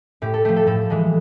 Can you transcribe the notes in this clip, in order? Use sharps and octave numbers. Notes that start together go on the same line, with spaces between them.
A2 G4
A4
F3 A3 G4
A4
A2 A4
E3 G#3